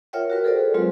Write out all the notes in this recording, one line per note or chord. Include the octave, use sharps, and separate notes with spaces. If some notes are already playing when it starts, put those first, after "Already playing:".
F4 A#4 C#5 E5 F#5 G5
F#4 A#4 B4
G#4 A4 B4 C5 D5
F#3 G#3 C4 F4 F#5